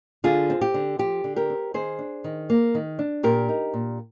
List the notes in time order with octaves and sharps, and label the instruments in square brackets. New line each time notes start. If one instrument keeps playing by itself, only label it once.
[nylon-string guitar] D3 F4 G#4
C4
G4
D3
F3 G4
D3
G4 A#4
C4
D#3 G#4 C5
D4
D#3
A#3
D#3
D4
A#2 G4 A#4
D#4
A#2